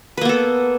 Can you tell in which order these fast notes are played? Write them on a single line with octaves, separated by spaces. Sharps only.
B4 A#3 B3 A4